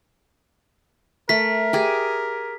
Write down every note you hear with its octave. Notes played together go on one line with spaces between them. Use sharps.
A3 A#4 B6
G4 G#4